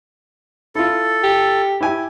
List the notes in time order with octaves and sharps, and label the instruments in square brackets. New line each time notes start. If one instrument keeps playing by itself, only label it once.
[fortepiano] E4 F4 [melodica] A4
[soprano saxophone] G4
[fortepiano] E4 G4 G#5